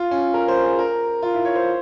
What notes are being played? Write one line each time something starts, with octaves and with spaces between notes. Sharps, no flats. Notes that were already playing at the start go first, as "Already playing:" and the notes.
Already playing: F4
C#4
A#4
C5
G#4
A#4
F4
E4
C#5
C5